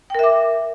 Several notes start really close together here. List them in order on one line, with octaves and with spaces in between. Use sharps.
G5 A#4 E5 D6